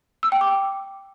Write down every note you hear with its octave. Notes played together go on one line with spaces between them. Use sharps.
E6
G5
D6